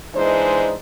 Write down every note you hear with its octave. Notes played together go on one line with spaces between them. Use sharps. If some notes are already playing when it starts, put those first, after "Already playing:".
E3 G#3 D4 D#4 C5